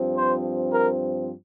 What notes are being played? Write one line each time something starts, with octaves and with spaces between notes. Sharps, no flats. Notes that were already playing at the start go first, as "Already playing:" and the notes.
Already playing: G2 F3 C4
C5
A#4